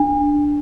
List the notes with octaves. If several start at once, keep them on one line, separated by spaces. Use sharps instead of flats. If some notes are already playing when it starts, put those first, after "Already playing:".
Already playing: D4